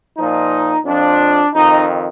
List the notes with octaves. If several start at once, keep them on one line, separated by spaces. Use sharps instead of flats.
A#2 F3 D#4
F2 F3 D4
F2 D#3 D#4